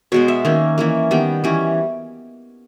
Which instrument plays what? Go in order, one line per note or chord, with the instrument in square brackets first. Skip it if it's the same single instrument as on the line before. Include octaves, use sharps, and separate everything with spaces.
[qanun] B2 G#3 B3 C#5
E5
D#3 A#3 C#4
E3 A#3 C#4
D#3 G3 B3 G5
E3 G3 C#4